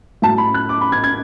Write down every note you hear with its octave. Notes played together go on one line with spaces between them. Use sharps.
A2 F#3 A5
B5
F#6
D6
B5
G#6
G#6